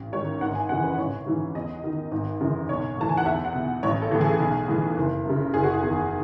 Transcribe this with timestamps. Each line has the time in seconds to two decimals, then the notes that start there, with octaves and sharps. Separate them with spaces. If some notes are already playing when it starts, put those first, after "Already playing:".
Already playing: A1
0.13 G#2 D#3 C#5
0.41 G#1 F#5
0.55 G#5
0.69 F#2 C#3 E3 F#5
0.84 B4
0.98 A1 C#5
1.27 G#2 E3
1.55 E2 D#5
1.84 D#3
2.12 G#1
2.40 F#2 C#3 E3
2.69 B1 C#5
2.98 A2 E3 A5
3.09 G#5
3.17 F#5
3.26 E2 E5
3.45 F#5
3.55 B2
3.83 A1 C#5
4.02 A4
4.11 A2 E3
4.21 G#4
4.40 B1
4.68 A2 E3
4.97 F#1
5.25 F#2 C#3
5.54 F#1 G#4
5.64 F#4
5.74 G#4
5.82 E2 D#3